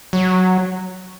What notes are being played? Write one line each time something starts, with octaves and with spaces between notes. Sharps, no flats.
F#3